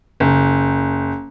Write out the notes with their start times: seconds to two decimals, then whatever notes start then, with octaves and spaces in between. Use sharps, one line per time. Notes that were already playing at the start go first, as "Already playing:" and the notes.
0.20 F#1